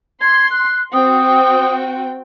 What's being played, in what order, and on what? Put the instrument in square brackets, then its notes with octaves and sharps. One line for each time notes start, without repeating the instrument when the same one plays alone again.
[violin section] C6 [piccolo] G#6
[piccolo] F#6
[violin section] C4 F#4 G5 [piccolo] D#6